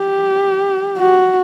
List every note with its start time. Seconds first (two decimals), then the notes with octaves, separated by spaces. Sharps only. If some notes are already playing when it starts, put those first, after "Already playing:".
Already playing: G4
0.98 F#4